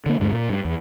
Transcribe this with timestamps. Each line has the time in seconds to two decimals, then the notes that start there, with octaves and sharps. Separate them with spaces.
0.06 D3 A#3
0.20 D2 G2 G#3
0.32 A#2
0.49 G2
0.65 E2